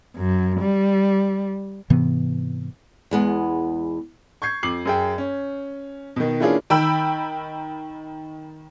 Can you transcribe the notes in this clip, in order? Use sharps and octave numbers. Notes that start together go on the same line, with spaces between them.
F#2
G3
G#2 C3 E3 B3
E2 G#3 B3
C#6 G6 G#6 C7
F2 D6 C7 F#7
F#2 G#4 G5
C#4
B2 D#3
E3 A#3 C#4 D4 F4 G#4
D#3 G5 B5 E6